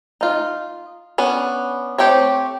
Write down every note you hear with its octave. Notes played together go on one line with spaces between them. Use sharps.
D#4 F4
B3 C#4 D4
A3 C4 G4 A4 C#5